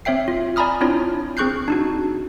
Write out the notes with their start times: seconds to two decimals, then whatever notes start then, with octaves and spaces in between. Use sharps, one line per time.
0.05 C4 C#5 E5 G5 C7
0.28 F4
0.56 D5 G#5 A#5 B5 D#6 F6
0.81 C4 D4 E4 F4 C#5
1.37 C4 G#4 C#6 F#6 G6 C7
1.68 D4 D#4 F#4